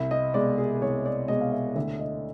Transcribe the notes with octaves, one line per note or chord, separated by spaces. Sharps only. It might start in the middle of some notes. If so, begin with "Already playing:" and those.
Already playing: C2 E5
D#5
B2 G#3 D5
G#4
C2 C#5
D5
B2 G#3 D#5
F5
E5
D2 E5
D#5